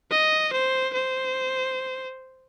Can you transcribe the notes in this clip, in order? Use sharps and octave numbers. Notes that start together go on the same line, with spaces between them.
D#5
C5
C5